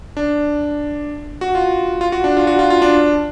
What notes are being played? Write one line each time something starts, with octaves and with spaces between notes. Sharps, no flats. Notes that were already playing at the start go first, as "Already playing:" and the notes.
D4
F#4
F4
F4
F#4
D4
F4
F#4
F4
F4
D4